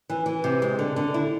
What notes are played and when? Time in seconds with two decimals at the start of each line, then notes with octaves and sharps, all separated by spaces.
0.09 E3
0.26 E3
0.44 C3
0.62 G#3
0.79 D3
0.96 D3
1.14 E4